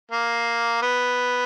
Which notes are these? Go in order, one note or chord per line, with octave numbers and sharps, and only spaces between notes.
A#3
B3